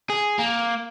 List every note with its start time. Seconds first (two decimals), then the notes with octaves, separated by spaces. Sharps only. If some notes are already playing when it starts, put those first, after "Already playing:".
0.10 G#4
0.39 A#3